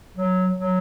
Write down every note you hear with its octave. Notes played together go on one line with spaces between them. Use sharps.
F#3
F#3